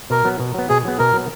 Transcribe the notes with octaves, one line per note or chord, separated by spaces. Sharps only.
B2 A#4
F#3 B3
B2
F#3 B3
B2 G#4
F#3 B3
B2 A#4
F#3 B3